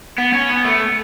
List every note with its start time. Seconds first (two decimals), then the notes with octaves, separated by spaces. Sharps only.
0.18 B3
0.33 C#4
0.49 B3
0.64 A3